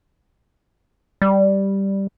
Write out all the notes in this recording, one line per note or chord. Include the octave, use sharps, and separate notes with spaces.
G3